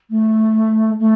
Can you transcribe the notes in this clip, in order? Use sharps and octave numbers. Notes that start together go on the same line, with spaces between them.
A3
A3